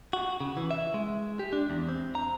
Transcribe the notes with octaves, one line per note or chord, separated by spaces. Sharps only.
F#4
C#3
E3
E5
G#3
G4
D4
E2
C4
A#5